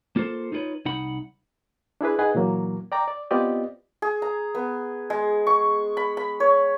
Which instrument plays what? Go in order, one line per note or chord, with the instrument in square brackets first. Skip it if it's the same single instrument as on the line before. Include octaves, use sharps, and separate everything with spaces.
[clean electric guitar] A#3 F4 A4 C5
D#4 F4 G#4 B4 C#5
C2 D#4 F#5 B5
[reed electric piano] D4 E4 G#4 B4
D#4 G#4 B4 D#5 F#5 G#5
A#2 E3 F#3 A#3
D5 G5 A#5 D6
D5
B3 C4 F4 G4 D5 D#5
[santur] G#4
A#5
B3
G#3
C#6
B5
B5
C#5